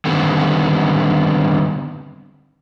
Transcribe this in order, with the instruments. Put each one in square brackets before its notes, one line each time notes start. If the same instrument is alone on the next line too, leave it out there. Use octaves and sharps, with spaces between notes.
[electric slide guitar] D3 D#3 G3 B3 C4